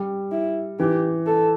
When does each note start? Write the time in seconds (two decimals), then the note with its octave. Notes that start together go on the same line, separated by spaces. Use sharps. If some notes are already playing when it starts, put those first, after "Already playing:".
Already playing: G3
0.31 E4
0.79 E3 G4
1.26 A4